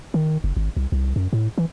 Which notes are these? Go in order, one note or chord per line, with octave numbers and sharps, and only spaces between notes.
D#3
F#1
G#1
C2
C2
F#2
A2
E3